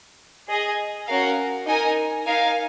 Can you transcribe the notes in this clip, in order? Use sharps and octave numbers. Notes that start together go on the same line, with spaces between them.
G#4 D#5 G#5
C#4 F#4 A#4 F5
D#4 A#4 D#5 G#5
D#4 A#4 F5 G#5